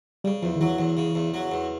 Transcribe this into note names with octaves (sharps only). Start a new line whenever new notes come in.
C#3 G3
E2 F3
D#3
E3 F#3
E2 E3
C#3
E2
F#3
E2